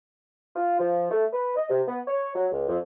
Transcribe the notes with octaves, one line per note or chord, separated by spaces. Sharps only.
F4
F3
A3
B4
D#5
C3
B3
C#5
F#3
C#2
F2